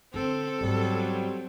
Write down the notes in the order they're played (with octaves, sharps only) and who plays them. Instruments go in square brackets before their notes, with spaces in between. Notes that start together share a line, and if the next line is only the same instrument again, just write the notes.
[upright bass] D3 [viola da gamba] C4 [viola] A4
[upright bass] G#2 B3 [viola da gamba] F#3 C4 [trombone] G3